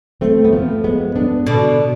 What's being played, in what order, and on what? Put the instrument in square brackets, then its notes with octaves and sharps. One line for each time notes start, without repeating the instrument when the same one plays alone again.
[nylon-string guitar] A3 C4
B3
F3 A3
G#3 B3
B3 D4
[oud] B2 D3